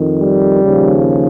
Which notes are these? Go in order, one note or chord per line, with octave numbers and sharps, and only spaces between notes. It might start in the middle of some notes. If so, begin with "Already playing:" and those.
Already playing: F2 D#3
G3
D#2 C#3 F3